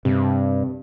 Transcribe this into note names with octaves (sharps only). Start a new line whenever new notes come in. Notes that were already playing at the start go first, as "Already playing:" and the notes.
G2 C3